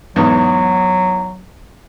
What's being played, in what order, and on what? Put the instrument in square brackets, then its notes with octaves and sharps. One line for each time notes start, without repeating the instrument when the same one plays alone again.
[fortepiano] E2 G#2 B3 [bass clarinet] F#3